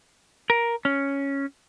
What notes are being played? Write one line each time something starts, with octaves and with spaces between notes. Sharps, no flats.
A#4
C#4